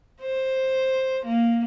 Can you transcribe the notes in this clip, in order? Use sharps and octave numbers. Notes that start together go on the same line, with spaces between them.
C5
A#3